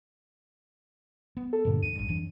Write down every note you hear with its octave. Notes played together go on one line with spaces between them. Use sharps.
B3
A4
G2 A#2 D3 A#3
E2 D4 D#7
G#1 G2
F2 E3 D4